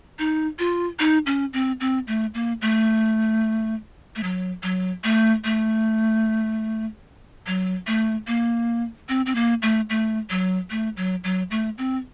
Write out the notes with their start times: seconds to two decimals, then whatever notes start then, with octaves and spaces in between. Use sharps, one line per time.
0.19 D#4
0.59 F4
0.99 D#4
1.26 C#4
1.53 C4
1.80 C4
2.07 A3
2.34 A#3
2.62 A3
4.16 A3
4.23 F#3
4.63 F#3
5.04 A3
5.44 A3
7.47 F#3
7.87 A3
8.27 A#3
9.09 C4
9.26 C4
9.35 A#3
9.62 A3
9.90 A3
10.30 F#3
10.70 A3
10.97 F#3
11.24 F#3
11.51 A3
11.78 C4